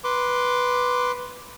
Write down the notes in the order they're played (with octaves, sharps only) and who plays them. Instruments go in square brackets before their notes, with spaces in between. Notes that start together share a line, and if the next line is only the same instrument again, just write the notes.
[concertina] B4 C6 D6